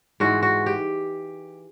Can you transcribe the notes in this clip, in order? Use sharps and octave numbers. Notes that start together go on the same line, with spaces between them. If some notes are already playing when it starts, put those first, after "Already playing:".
G#2 E3 G#3 F#4
F#4
G4